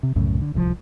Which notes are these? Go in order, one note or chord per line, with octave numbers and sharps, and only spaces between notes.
C3
C2 F#2 A2 C#3
D3
D1 C2 A#2 F3